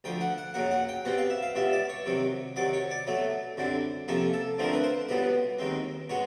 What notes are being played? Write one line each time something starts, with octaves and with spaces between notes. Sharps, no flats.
D2 D3 F3 G5
F#5
F#5
F#2 C#3 F#3 A#3 F#5
F#5
G5
B2 G3 C4 F#5
F5
E5
F5
C#2 B2 G3 E5
D5
C#5
C3 D#3 F#3
C3 D#3 F#3 D5
C#5
D5
B2 F#3 A3
F#2 D3 G3 C4
C3 F3 A#3 C#4 A4
A4
D2 D3 F3 A3 C4 A#4
B4
C5
C#2 B2 G3 B3 B4
D#2 D#3 G#3 C4
B2 G#3 B3 C#5